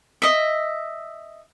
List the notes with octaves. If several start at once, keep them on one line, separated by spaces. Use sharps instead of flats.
D#5 E5